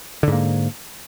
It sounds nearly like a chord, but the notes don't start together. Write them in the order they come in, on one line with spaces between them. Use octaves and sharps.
D3 G#2 A#3